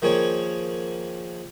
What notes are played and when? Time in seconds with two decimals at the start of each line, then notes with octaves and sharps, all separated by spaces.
0.02 D#3 F3 A#3 G#4 C#5